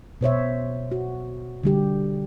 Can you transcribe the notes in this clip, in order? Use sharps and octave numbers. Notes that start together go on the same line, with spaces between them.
B2 C5 C#5 E5
F#4
D3 G3 G4